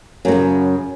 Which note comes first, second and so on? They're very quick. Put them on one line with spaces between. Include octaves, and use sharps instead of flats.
F#2 A#2 C#3